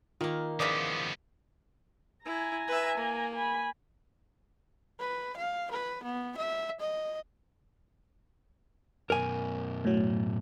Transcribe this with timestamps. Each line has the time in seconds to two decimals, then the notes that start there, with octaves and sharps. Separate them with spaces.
0.21 D#3 A#3 F4
0.60 C#3 E3 F3 B3 D5 D#6 B6
2.25 E4 G#5 A#5
2.68 B4 E5
2.97 A#3
3.35 G#5 B5
5.00 B4
5.37 F5
5.71 B4
6.03 B3
6.37 E5
6.80 D#5
9.10 F#2 B2 A#4 G#5
9.85 A2 F#3